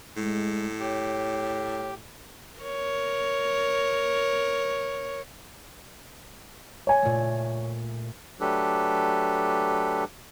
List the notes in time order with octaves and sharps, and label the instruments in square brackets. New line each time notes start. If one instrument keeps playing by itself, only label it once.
[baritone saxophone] A2 [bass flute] G#3
[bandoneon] G4 [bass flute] C#5
[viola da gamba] A#4 C#5
[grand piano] C#5 G#5
[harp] A#2 A3
[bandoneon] F#3 A3 D4 G4 A4 B4